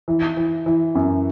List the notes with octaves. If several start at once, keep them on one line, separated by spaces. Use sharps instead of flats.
E3
E3
E3
F#2